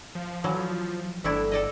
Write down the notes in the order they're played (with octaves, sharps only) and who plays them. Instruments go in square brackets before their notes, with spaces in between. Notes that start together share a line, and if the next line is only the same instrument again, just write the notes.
[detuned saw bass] F3
[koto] E3 F#3
[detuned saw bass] G1 [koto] A3 D4 E4
[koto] A4 D5 D#5